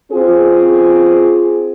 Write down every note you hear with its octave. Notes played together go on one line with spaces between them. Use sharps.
C4 F4 G#4